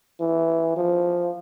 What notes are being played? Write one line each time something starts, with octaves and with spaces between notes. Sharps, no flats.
E3
F3